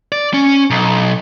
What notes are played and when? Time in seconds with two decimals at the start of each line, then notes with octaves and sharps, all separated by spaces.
0.12 D5
0.33 C#4
0.70 B1